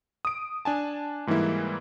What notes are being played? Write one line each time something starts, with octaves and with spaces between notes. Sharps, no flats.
D#6 D7
D4 G#5 A5
G#2 E3 G3 A#3 E4